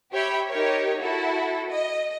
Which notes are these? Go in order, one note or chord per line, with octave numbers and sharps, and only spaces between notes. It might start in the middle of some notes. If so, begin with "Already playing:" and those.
G4 C#5 E5 G5 B5
D#4 G4 A#4 C#5
E4 F#4 A4
D#5